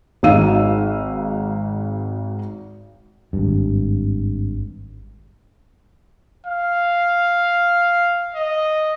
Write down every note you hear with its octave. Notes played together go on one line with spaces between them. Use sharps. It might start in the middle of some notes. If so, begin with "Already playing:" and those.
G#1 D#4 F#4 F5 E6 D#7
G#1 G2
F5
D#5